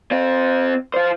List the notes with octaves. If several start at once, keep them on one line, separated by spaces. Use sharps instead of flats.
C4 F4
F4 C5